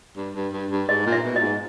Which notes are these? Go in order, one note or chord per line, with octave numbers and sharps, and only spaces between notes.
G2
G2
G2
G2
G#2 D#5
A#2
E5
B2
A#2 D#5
G#2